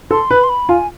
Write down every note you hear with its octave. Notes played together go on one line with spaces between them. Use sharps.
A4 C6
B4 B5
C6
B5
F4 G#5